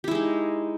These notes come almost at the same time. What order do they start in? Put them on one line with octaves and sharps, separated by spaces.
G4 E4 G#3 D#4